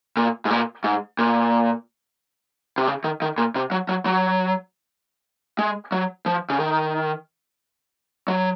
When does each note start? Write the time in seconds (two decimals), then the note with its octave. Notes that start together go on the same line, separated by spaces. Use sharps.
0.17 A#2
0.45 G#2
0.51 A#2
0.84 G#2
1.19 A#2
2.78 C3
2.88 C#3
3.04 D#3
3.22 D#3
3.38 A#2
3.56 C3
3.71 F#3
3.89 F#3
4.06 F#3
5.59 G#3
5.92 F#3
6.26 F3
6.50 C#3
6.60 D#3
8.28 F#3